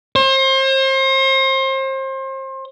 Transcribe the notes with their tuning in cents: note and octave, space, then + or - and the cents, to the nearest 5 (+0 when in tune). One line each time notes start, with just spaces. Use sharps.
C5 +35